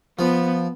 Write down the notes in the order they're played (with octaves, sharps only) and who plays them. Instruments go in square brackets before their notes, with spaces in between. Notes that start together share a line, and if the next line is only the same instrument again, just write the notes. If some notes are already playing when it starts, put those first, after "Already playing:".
[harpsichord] F3 [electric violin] B3